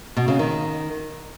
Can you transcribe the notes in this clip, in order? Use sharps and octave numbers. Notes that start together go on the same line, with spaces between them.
B2
C#3
D#3